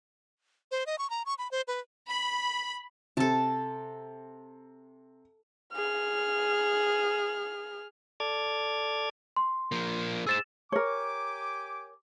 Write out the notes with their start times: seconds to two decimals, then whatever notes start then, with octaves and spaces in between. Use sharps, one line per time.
0.71 C5
0.86 D#5
0.98 C#6
1.10 A#5
1.26 C#6
1.38 B5
1.51 C5
1.68 B4
2.08 B5
3.17 C3 A4 A5
5.74 G#4 F6
8.20 A4 D5 D6 F6 G#6
9.37 C6
9.72 F3 A#3
10.27 G#4 C5 E6 A6 E7
10.72 G4 A#4 C#5 G#5 D6